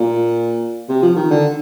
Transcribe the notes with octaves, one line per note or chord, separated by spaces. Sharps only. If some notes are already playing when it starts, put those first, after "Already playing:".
Already playing: A#2
C3
F3
D#3
D3